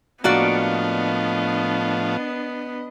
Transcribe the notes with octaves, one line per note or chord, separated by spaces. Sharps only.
A2 F3 A#3 B3 D4 F#4 D5 D#5